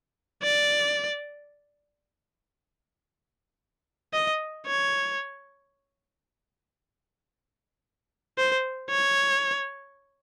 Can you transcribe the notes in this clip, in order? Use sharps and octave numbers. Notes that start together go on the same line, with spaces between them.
D5
D#5
C#5
C5
C#5